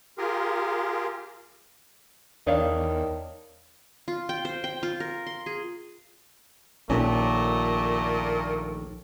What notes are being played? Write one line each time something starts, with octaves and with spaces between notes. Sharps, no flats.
F4 G4 G#4 A#4
E2 D#3 D4 C#5 F5
F4
G5
C5
G5
F4
A#4
C6
G#4
A#1 D#2 A#2 A3 C#4